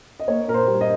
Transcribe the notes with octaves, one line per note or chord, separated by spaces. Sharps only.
D#5
A#3 C#5
A#2 A#4
C5
G3
D#5